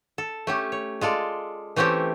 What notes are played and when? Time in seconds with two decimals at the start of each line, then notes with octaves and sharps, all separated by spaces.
0.18 A4
0.47 A3 C#4 G4
0.72 C#5
1.01 G#3 F4 A4 D5
1.76 E3 A3 C4 C#4 G4 A4